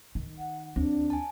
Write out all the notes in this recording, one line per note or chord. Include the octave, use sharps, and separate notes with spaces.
D#3
F#5
D#2 C4 D4
G#5 A5